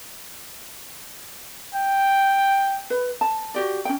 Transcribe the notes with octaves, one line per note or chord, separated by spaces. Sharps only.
G5
B4
A5
F#4 G4 D5
C#4 G5